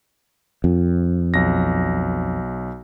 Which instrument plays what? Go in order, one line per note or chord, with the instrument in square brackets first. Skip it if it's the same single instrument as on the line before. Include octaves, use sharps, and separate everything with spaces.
[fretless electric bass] F2
[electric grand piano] B1 A#6